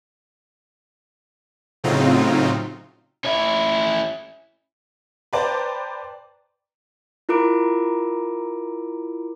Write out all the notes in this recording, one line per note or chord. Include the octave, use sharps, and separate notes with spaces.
A2 C#3 F#3 C4 D#4 F4
C#4 E4
B4 C5 D5 G5 A5 A#5
E4 F4 A#4 A#5 D6 D7